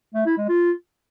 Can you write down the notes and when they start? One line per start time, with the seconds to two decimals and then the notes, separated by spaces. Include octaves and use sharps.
0.14 A3
0.26 E4
0.37 G#3
0.49 F4